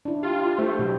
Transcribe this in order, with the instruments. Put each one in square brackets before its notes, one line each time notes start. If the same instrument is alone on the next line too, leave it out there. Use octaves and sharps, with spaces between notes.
[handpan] D4 E4
[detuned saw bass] F4 [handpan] G4
[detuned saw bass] A3 [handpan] C5
[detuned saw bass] B2 [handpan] F#3 G4